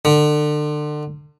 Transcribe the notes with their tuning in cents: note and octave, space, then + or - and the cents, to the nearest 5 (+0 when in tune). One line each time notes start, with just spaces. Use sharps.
D3 +30